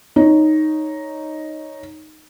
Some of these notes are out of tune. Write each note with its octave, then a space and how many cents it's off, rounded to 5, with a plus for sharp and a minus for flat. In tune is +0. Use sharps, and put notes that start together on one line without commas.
D#4 +0 C#5 +0